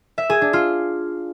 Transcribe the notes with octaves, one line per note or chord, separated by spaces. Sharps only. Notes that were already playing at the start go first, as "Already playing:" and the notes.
E5
G#4
D4
F4